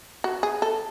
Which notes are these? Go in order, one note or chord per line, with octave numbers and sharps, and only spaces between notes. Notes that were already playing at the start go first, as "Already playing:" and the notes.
F#4
G#4
A4